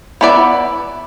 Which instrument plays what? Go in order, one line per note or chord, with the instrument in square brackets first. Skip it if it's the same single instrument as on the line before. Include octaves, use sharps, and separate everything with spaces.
[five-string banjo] B3 E4 B4 D5